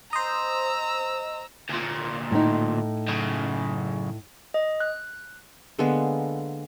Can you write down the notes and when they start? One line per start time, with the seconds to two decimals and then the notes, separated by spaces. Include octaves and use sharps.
0.13 C5 D#5 A#5 E6
1.70 D2 A#2
2.31 A2 D#4
3.08 F#2 C#3
4.54 D#5
4.80 F#6
5.79 D3 G#3 A#3 B3